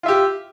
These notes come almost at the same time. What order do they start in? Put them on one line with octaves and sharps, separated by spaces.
F4 E5 G4